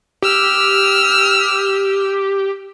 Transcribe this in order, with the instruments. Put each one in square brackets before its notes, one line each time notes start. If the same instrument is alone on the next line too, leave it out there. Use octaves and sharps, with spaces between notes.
[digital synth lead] G4 [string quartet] E6 F6